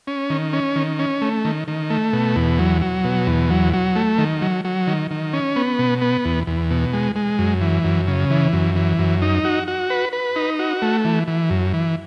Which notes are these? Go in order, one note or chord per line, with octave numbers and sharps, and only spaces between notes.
C#4
D#3
C#4
D#3
C#4
A3
D#3
D#3
A3
B2
E2
F#3
F#3
B2
E2
F#3
F#3
A3
D#3
F#3
F#3
D#3
D#3
C#4
B3
B2
B3
E2
E2
B2
G#3
G#3
F#2
E3
F#2
C#3
E3
F#2
E3
F#2
D#4
F#4
F#4
B4
B4
D#4
F#4
A3
E3
E3
F#2
E3